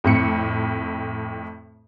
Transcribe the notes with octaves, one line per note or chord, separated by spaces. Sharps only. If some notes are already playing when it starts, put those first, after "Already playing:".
F2 A2 C#7